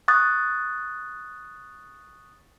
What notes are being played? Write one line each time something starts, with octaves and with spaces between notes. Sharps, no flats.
C#6 D#6 F#6 A6